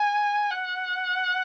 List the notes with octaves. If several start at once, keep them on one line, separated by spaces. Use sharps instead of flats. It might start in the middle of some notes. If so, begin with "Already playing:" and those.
Already playing: G#5
F#5